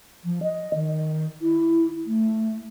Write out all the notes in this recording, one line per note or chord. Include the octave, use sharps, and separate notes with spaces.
F3
D#5
D#3
E4
A3